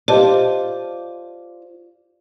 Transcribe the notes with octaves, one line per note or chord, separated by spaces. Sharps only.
F4 G4 C5 D5 D#5 A5